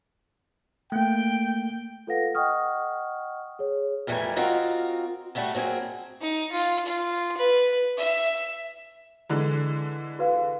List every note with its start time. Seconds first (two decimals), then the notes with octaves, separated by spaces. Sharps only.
0.92 A3 A#3 G5
2.07 F4 A4 B4 F5 F#5 A#6
2.35 D#5 F#5 G5 C#6 D#6 F6
3.59 G#4 C#5
4.07 F2 E3 G3 A3 A#4 G#5
4.36 C4 F4 F#4 A#4 D#5
5.35 G3 A3 F#4 A4
5.55 F#3 A#3 C4 G#4
6.21 D#4
6.52 F4
6.85 F4
7.37 B4
7.97 E5
9.30 D3 E3 G#3
10.19 F#4 B4 F5